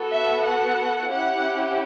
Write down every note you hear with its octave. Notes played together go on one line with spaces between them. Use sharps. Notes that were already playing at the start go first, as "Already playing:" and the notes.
Already playing: B3 F#4 A4
E5
F#5
C#4 E4 G4 F#5